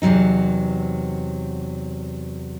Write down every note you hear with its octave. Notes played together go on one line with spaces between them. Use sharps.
E2 C3 E3 F#3 D#4